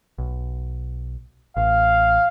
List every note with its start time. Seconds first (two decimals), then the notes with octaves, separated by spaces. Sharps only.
0.18 B1
1.57 A1 F5